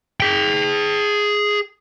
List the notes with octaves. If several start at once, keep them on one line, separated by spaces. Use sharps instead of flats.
G#4 G5